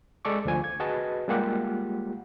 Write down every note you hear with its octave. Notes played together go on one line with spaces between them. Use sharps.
G#3 A4 D5 C#6 D6
D2 F3 G#5
G#6
F#4 G#4 B4 D#5 A5
G3 G#3 A#3 F4 G4 F#5